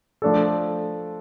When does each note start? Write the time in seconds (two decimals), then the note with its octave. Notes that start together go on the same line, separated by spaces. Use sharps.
0.22 F3 A3 D4 A4